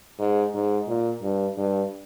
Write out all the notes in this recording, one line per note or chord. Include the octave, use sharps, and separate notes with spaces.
G#2
G#2
A#2
G2
G2